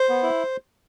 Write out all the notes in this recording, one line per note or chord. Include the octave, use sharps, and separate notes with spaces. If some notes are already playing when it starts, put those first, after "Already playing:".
Already playing: C5
B3
E4